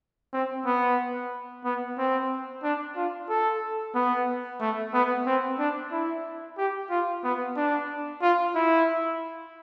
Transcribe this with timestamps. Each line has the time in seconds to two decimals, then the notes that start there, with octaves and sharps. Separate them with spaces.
0.33 C4
0.66 B3
1.65 B3
1.98 C4
2.63 D4
2.97 F4
3.29 A4
3.95 B3
4.61 A3
4.94 B3
5.26 C4
5.59 D4
5.92 E4
6.58 G4
6.90 F4
7.24 B3
7.56 D4
8.22 F4
8.55 E4